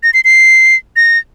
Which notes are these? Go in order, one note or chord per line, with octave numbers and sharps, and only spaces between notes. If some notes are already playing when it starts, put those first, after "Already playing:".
A#6
C7
C7
A#6